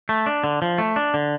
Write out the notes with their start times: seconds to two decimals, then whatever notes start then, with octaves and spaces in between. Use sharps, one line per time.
0.09 A3
0.26 D4
0.44 D3
0.62 F3
0.78 A3
0.96 D4
1.14 D3